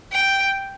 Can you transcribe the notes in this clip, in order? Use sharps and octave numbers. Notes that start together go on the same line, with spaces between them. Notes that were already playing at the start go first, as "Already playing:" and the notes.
G5